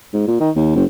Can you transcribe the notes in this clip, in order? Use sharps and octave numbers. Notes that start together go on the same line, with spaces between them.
G#2
A#2
D#3
D#2
F#1